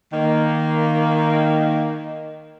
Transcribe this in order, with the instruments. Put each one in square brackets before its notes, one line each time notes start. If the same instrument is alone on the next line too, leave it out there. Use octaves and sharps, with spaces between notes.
[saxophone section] D#3 A#3